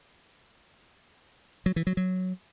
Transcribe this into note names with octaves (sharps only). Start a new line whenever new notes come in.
F#3
E3
F#3
F#3